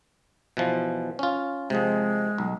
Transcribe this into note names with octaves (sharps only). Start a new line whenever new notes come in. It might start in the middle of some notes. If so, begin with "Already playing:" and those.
B2 E3 F3
C#4 F4
C3 F3 G#3
B1